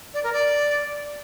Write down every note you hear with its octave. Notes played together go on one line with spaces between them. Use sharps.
D5
A#4
D5